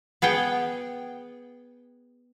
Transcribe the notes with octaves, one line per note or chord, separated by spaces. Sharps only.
B3 G#4 F#5 G5